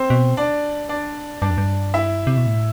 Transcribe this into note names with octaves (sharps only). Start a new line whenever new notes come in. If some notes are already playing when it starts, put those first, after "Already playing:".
Already playing: C4 C5
B2
D4 D5
D4 D5
G2 D4 D5
F2
G2
E4 E5
C3
B2
A2